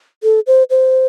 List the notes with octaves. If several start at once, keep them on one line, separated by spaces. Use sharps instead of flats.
A4
C5
C5